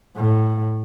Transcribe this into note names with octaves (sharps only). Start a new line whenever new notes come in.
A2